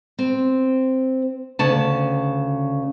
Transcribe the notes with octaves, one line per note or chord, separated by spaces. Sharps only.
C4
D2 C#3 A5